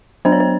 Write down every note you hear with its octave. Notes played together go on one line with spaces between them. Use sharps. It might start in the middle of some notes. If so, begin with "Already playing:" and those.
F#3 B3 D4 C5
C#5
C5